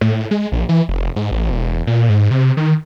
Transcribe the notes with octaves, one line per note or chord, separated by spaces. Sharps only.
A2
G#3
A#1
E3
F1
G#2
A1
E1
A#2
G#2
C3
D#3